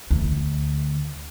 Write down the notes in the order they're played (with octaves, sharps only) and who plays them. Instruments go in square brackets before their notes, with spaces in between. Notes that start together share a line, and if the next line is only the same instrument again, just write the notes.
[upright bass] D2